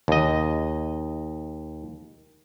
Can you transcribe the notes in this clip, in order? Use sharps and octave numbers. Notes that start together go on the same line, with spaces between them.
D#2 D#5